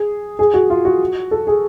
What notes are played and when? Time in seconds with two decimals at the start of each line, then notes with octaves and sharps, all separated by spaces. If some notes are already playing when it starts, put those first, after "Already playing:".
Already playing: G#4
0.39 G#4
0.54 F#4
0.70 F4
0.85 F#4
1.31 A4
1.47 G#4